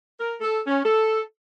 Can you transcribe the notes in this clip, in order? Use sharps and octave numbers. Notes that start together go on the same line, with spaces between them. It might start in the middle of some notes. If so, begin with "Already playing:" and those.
A#4
A4
C#4
A4